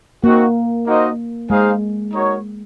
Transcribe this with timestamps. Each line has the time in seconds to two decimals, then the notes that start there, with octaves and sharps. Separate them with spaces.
0.23 A#3 C4 D#4 F#4
0.86 A#3 D#4 F#4 C5 D#5
1.50 G#3 D#4 G#4 C5 F5
2.13 D#4 F#4 A#4 C#5